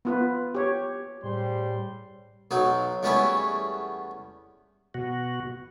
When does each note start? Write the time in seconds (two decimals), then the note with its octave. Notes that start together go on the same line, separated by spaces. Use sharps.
0.05 B3 F4 B4
0.55 G4 C#5
1.24 A2 C#3 G3 C5 C6
2.51 B1 F#3 D#4
3.03 E2 G3 A3 B3 C#4 E4
4.94 B2 F#4